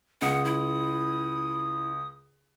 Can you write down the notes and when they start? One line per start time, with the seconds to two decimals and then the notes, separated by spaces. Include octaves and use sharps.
0.22 C#2 F#5 D#6
0.45 E4